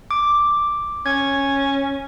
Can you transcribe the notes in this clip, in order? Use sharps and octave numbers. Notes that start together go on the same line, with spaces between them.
D6
C#4 G#6